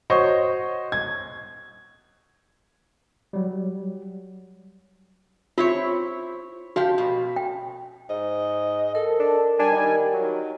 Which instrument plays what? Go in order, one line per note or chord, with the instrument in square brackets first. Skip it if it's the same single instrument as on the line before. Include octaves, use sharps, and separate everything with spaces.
[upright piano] F#4 C5 C#5 D#5 C#6
G#6
[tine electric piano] F#3 G3
[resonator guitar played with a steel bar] C4 E4 C#5 [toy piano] F4
[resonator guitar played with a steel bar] F3 G4 [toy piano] F#4 F5
[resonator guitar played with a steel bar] B2
[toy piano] G5
[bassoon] G#2 [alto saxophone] D#5
[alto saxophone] A4 [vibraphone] A#4
[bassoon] D4
[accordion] G3 G#5 [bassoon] D4 [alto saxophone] G4
[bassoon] D#3
[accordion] D#3 [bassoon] F#3